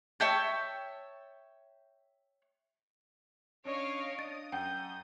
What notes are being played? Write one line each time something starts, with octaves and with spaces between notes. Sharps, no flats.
C#5 E5 G5 A5
C#4 D4 C#5 D#5 F5 D7
D4 D#6 A6
F#2 F#5 G5 G6